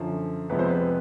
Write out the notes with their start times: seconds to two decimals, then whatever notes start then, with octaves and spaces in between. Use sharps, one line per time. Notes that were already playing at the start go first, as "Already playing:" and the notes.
Already playing: F#2 D3 F3
0.50 F2 C3 F3 G#3 B3 B4
0.59 C5
0.68 B4